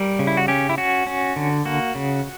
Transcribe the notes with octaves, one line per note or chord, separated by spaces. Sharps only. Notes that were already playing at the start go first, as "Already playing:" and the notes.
Already playing: G3 A#4
C#3
E4
F#4
C#4 G4
E4
C#4 F#4
C#4
D3
A#3 F#4
C#3